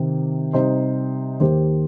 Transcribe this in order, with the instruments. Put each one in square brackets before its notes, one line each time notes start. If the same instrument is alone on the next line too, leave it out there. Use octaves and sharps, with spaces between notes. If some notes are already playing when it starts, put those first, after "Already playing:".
Already playing: [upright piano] C3 D#3 C4 G4
C3 G3 D#4 C5
D#2 D#3 A#3 G4 C5